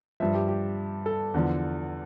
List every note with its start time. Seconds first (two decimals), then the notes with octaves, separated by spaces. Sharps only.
0.20 G2 F3 E5
0.35 G4
0.48 G4
1.06 A4
1.34 E2 D3 F3